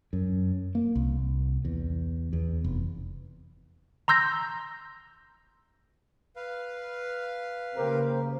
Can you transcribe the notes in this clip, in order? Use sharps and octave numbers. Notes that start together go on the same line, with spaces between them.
F#2
A#3
C2
E2
E2
F1
A#5 C6 E6 G6 A#6
B4 F5
C#3 A#3 G4 A#4 C5